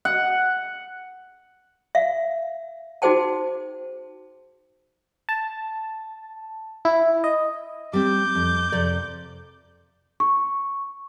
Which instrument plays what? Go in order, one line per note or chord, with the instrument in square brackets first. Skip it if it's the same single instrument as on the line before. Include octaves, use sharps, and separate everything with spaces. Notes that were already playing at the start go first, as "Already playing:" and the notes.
[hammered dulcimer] F#5
[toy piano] E5 F5
D#4 F#4 G#4 C5 G5 A5
[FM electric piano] A5
E4
D#5
[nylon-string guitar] G3 C4 [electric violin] D6 G6
[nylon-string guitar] F2
F2 C3 D5
[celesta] C#6